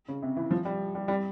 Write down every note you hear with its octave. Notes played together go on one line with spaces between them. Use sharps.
C#3
C3
E3
F3
G3
G3
G3